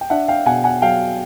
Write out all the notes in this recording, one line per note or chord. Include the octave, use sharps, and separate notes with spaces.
G5
D4 E5 F#5
F5 G5
B2 F#5 G#5
F#5 G#5
F#3 F5 G5